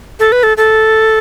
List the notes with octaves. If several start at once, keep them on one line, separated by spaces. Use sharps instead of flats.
A4
B4
A4
A4